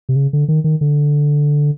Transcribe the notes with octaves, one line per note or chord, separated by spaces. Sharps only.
C3
C#3
D3
D#3
D#3
D3